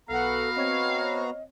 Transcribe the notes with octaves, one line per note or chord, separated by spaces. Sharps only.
B1 B3 F#4 A4 F5 F#5 A#5
C4 C#5 D#5